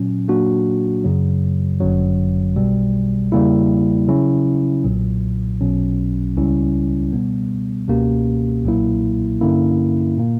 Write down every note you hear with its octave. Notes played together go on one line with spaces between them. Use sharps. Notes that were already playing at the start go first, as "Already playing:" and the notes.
Already playing: A#2 F#3 C#4
A#2 F#3 A#3 D4 F#4
F#2 C#3 F#3
G1 F#2 D3 F#3
B1 B2 G3
E2 C#3 G3 A#3 E4
C#3 F#3 C#4 E4
B1 A#2 F#3
B1 B2 F#3 C#4
C#2 C#3 G3 C#4 E4
B2 G3 B3
C#2 B2 A#3 C#4 G4
B1 A#2 F#3 A#3 E4
G2 D3 A#3 C#4 E4
A#2 A#3